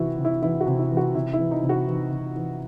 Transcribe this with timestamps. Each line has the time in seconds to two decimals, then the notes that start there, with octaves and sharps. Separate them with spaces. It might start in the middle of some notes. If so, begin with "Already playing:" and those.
Already playing: C3 E3 E4 F#4
0.18 C3
0.25 E4
0.42 E3 E4
0.61 F#4
0.67 C3
0.79 E4
0.91 E3
0.97 F#4
1.15 C3 E4
1.33 E4
1.39 E3
1.51 D#4
1.63 C3
1.69 F#4
1.87 E3
2.11 C3
2.36 E3